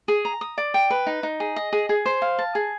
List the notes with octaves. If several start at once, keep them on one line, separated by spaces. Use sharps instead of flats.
G#4
A#5
D#6
D5
G5
B4
D#4
D#4
G#4
D#5
G#4
G#4
C5
F5
A5
G#4